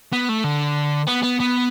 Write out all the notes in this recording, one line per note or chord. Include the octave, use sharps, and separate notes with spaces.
B3
A3
D3
B3
B3
B3